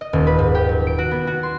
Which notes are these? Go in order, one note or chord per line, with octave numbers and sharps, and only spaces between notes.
D#5
D#1
B4
G#2
G4
F#3
D7
F#4
B3
F#4
C6